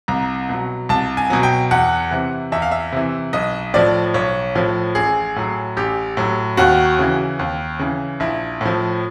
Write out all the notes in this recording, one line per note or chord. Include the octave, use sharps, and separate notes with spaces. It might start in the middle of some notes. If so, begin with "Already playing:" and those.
C2 A#5
B2 F#3
C2 A5
G#5
B2 F#3
G5
E2 F#5
C3 E3
E2 E5
F5
E5
C3 E3
B1 D#5
A2 F3 D5
B1 C#5
A2 F3
A1 G#4
A2 F#3
A1 G4
A2 F#3
D#2 F#4
C#3 E3
D#2
C#3 E3
A#1 E4
A2 F3